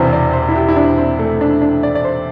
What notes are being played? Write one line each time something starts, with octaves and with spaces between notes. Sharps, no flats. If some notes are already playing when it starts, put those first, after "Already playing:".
Already playing: E1 E2 C3 E3 C5
D5
C5
E4
G4
E4
D4
C4
A3
D4
D4
D5
D5
C5